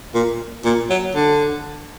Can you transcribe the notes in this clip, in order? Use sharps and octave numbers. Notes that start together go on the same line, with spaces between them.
A#2
A#2
F#3
D3